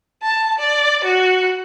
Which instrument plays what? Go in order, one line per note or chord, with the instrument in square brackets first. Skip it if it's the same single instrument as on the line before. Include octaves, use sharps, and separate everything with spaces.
[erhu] A5
D5
F#4